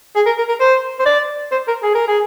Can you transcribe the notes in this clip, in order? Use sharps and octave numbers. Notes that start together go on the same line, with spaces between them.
G#4
A#4
A#4
A#4
C5
C5
D5
C5
A#4
G#4
A#4
G#4